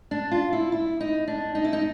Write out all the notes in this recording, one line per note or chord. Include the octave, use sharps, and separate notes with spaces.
D4
F4
E4
E4
D#4
D4
D#4
E4
D#4